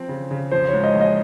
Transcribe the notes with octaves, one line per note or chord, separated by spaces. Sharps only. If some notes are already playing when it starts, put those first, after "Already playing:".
Already playing: F3 C4
C#3
C#3
F3 C5
G#2 C#5
D#5
A#1
D#5